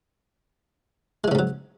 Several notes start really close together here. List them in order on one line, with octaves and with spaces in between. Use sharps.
G#3 E3 C#3 G#2 F#3